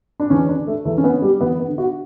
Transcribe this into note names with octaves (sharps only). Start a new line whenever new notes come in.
D4
E2 C#4
D4
D3
A3
E2 A3
C#4
B3
D3
G3
E2 B3
B3
D3
F#4